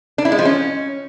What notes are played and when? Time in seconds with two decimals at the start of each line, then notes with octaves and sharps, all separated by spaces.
0.18 D4
0.25 E4
0.32 G#3
0.39 F3
0.45 C#4